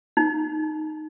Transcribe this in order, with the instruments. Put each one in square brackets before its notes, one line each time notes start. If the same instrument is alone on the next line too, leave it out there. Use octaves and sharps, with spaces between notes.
[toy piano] D#4